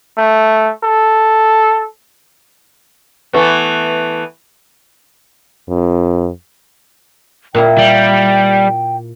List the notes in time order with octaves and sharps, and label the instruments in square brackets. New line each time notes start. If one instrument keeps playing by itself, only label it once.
[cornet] A3
A4
[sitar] E3 A3 B3
[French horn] F2
[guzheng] A#2 A#3 E4 [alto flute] G5
[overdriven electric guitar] G3